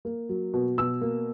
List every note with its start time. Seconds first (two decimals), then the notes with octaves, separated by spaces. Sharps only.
0.05 A#3
0.29 F#3
0.54 B2
0.78 B2 E6
1.01 A#3